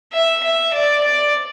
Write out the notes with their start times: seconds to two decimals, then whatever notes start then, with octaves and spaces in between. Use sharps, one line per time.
0.13 E5
0.44 E5
0.74 D5
1.04 D5